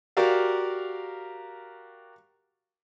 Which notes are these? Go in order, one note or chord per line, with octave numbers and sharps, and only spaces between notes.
F#4 G4 A#4 D5 F5